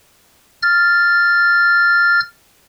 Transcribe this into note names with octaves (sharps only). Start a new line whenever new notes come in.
F6 A6